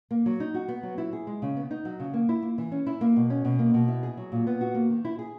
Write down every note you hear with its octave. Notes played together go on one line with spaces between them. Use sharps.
A#3
F#3
D#4
F#4
B3
F#3
E4
G#4
G#3
C#3
B3
D#4
F#3
C#3
A#3
E4
A#3
E3
C#4
E4
A#3
B2
C#4
B2
A#3
B2
E4
G#4
F#3
A#2
B3
F#4
A#3
D#3
E4
G#4